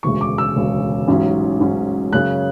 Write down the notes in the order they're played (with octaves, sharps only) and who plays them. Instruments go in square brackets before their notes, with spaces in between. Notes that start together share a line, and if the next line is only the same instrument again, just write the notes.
[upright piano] E1 D2 C#3 G#3 C#6
D6
E6
E1 D2 C#3 G#3
A1 G#2 F#3 C#4
A1 G#2 F#3 C#4
F#2 C#3 G#3 C#4 F#6